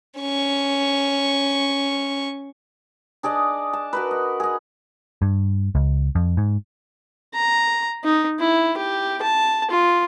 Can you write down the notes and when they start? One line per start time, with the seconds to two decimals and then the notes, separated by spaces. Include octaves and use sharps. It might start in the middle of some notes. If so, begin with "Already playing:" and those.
0.19 C#4 C#6
3.23 D4 G#4 D5 D#5
3.73 A5
3.93 F#4 A#4 B4
4.11 D#5
4.40 G#4 D#5
5.22 G2
5.75 C#2
6.15 F2
6.37 G#2
7.34 A#5
8.04 D#4
8.40 E4
8.77 G4
9.22 A5
9.71 F4